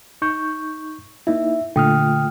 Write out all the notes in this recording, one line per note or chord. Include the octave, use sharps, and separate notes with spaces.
D#4 C#6 G6
A#3 D#4 E4 E5
A#2 D3 A3 F4 G5 D#6 F6